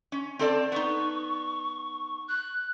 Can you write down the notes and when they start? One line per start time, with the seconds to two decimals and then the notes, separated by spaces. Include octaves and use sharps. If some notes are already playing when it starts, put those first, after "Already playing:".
0.12 C#4
0.39 C4 A4 D5
0.72 B3 D#4 C#6
2.28 F#6